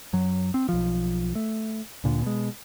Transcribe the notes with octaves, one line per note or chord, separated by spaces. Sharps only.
F#2 F#3
C4
B1 F3
A3
D2 A#2 D3
B2 G#3